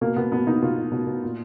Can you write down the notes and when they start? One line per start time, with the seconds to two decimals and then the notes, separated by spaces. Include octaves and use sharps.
0.01 B2 A#3
0.16 B2 B3
0.32 B2 B3
0.47 B2 D#4
0.62 B2 F4
0.78 B2
0.92 B2
1.07 B2
1.23 A#2